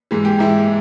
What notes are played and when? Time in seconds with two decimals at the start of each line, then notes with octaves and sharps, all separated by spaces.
0.11 G#2 E3 G#3
0.25 G4
0.39 G#2 E3 G#3 E4